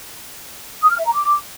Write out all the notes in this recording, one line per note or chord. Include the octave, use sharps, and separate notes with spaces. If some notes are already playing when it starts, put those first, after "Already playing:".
D#6
F6
E5
A#5
D6